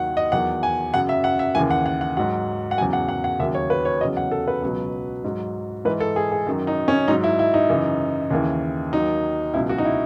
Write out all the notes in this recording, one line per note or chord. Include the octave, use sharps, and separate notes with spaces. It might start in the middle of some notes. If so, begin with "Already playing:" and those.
Already playing: D#2 D#3 F#3 F#5
D#5
E2 D#3 F#3 F#5
G#5
F#2 C#3 F#3 F#5
E5
F#5
E5
D#2 C#3 E3 G#5
F#5
F#5
F#5
G#2 F#3 F#5
F#5
E2 C#3 F#3 G#5
F#5
F#5
F#5
D#2 C#3 F#3 E5
C#5
B4
C#5
E2 C#3 F#3 D#5
F#5
A4
B4
C#2 B2 F#3
G#2 F#3
G#2 E3 B4
A4
G#4
G#4
F#2 D#3 F#3
D#4
C#4
G#2 F#3 D#4
E4
E4
D#4
F#2 C#3 E3
D#2 C#3 E3
D#2 D#3 F#3 D#4
C#2 B2 F#3 E4
F#4
D#4
E4